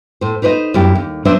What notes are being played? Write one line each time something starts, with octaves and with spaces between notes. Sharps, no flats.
A2 C5
D#4 B4 C5 D5 D#5
F#2 E4 G4
D#2
F#3 D4 B4 C5 D#5 E5